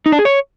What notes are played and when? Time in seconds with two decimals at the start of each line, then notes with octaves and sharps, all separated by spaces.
0.06 D#4
0.12 D4
0.19 G#4
0.25 C#5